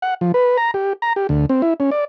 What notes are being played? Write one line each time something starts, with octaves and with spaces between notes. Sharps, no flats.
F#5
F3
B4
A#5
G4
A#5
G4
D2
C4
E4
C#4
D5